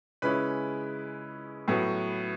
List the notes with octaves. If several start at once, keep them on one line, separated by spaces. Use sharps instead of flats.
C#3 G#3 C#4 E4 B4 B5
A2 F#3 B3